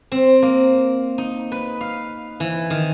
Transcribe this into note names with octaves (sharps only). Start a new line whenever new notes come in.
C4
A#3
D#4
B4
F5
E3
D#3